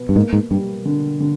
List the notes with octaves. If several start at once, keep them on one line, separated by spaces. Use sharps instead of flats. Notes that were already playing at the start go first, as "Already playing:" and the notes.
Already playing: B2 B3
G2
G#2 A#3
G#2
G2 G3
D3
D3